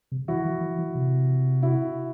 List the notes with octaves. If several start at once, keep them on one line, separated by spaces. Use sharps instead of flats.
C3
E3 E4 F#4
E3
E3
E3
C3
E4 F#4